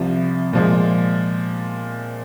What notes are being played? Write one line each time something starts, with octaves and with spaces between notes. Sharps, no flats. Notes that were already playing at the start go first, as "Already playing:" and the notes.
Already playing: C2 C3 F3
A#2 F3 G#3